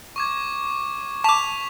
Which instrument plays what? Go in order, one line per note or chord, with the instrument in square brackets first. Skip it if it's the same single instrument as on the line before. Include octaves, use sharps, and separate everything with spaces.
[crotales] C#6 D6 G#6
[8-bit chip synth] A5 D6 [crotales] C#6 B6 F7